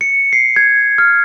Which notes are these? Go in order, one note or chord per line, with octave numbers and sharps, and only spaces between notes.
C#7
C7
G#6
F6